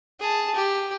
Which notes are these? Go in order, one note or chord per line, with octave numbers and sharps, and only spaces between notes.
G#4 A5
G4